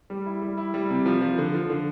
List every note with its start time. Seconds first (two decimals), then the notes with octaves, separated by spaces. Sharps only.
0.10 G3
0.26 E4
0.42 G3
0.57 E4
0.74 G3
0.90 C3
1.06 F3
1.21 F3
1.38 D3
1.54 F3
1.70 D3